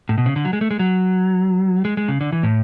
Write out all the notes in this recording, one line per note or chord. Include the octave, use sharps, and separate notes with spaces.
A2
B2
C#3
D3
F#3
G#3
A3
G#3
F#3
G#3
G#3
C#3
D3
E3
A2